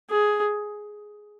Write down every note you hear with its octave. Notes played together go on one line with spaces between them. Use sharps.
G#4